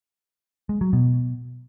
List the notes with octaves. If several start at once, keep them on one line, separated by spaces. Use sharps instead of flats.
G#3
F#3
B2